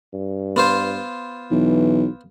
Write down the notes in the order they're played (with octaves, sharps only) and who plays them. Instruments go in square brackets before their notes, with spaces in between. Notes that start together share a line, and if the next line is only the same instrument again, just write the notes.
[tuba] G2
[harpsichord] B3 F4 C5
[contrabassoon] B1 [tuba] E3